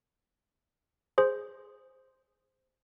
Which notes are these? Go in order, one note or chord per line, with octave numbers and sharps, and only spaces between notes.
G#4 C5